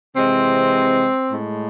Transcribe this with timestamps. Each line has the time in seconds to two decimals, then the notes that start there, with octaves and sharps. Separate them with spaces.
0.15 C3 E3 G#3 C4
1.31 A2 G#3